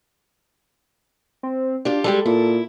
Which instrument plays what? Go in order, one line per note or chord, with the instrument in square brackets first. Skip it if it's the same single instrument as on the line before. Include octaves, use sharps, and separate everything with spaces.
[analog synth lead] C4
[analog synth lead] D4 [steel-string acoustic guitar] F4 G4
[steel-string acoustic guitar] G3 G#3 G4 [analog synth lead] A4
[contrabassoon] A#2 [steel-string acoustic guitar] E4